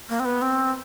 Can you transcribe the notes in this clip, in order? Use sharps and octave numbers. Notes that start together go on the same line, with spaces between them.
A#3
C4
B3
C4